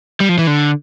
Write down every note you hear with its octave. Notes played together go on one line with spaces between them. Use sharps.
G3
F3
E3
D3